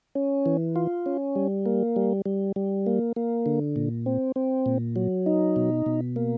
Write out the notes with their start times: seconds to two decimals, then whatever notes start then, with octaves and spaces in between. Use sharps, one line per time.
0.15 C#4
0.46 E3
0.76 F4
1.06 C#4
1.35 G3
1.66 A#3
1.96 G3
2.26 G3
2.56 G3
2.86 A#3
3.16 A#3
3.46 D3
3.76 A#2
4.06 C4
4.36 C4
4.66 A#2
4.96 F#3
5.26 D#4
5.56 B2
5.86 B2
6.16 A#3